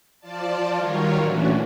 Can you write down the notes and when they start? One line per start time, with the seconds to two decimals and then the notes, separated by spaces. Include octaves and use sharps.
0.20 F3 F4 D5 A5
0.75 D#3 F#3 G3 F4 A#4 C#5
1.20 A#2 E3 A3 C#4 D4 F#4